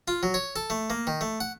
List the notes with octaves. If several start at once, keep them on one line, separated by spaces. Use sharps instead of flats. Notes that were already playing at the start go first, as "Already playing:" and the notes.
F4
F#3
C#5
A4
A3
A#3
D#3
A3
F#5